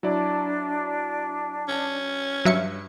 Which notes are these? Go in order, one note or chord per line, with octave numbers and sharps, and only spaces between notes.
F#3 D4 E4 D5
C#4
G2 F#3 E5 C#7